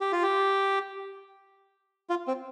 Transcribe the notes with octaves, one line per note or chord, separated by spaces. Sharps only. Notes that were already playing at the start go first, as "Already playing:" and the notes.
G4
F4
G4
F4
C4